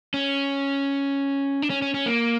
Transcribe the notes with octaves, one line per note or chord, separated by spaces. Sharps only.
C#4
D4
C#4
C#4
C#4
A#3